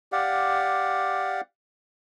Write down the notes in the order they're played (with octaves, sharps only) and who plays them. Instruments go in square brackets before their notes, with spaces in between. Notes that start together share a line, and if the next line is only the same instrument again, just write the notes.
[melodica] G4 D5 F5 F#5